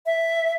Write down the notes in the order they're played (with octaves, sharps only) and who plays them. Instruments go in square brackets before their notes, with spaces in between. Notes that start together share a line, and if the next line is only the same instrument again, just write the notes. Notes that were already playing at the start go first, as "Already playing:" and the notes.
[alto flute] E5